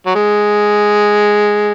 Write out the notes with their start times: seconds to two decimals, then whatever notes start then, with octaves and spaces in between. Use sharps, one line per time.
0.06 F#3
0.15 G#3